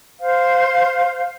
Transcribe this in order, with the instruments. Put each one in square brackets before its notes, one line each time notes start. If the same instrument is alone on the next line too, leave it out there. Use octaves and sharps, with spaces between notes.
[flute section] C5 F5